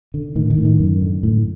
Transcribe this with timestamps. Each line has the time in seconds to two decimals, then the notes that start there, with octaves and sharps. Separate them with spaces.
0.14 D3
0.35 A2 D#3
0.50 D#3
0.58 A2
0.65 D#3
0.80 F#2
1.01 D3
1.23 A2